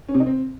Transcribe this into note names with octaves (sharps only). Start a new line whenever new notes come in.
C#4
C3
D#4
C4